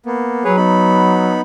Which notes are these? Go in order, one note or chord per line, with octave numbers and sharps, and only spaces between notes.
A#3 B3
F#3 G#4 B4 C#5
B3 D#4 B5